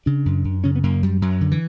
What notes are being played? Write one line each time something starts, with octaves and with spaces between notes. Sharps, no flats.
C#3 D4
F#2
F#2
C#3 C#4
B3
F#2 A#3
F#2 G3
F#2 F#3
D3
E3